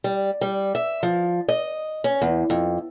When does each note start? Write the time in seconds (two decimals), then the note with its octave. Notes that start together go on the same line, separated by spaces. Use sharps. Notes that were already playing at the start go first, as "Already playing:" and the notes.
0.04 G3
0.41 G3
0.75 E5
1.03 F3
1.48 D#5
2.04 C#4
2.21 E2
2.50 F2